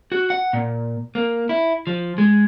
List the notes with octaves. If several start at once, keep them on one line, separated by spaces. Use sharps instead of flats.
F#4
F#5
A#2
A#3
E4
F3
G#3